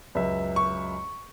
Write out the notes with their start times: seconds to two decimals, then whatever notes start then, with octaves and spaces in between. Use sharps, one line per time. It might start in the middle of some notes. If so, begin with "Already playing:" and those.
0.15 C#2 F#2 E5
0.56 C#6